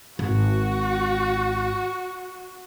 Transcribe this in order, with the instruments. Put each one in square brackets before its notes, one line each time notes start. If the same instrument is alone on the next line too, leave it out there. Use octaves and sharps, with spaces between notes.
[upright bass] G#1 [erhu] F#4